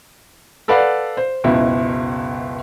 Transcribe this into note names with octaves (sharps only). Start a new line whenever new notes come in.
A4 B4 D5 F5 F#5
C5
F#1 C#2 B2 E4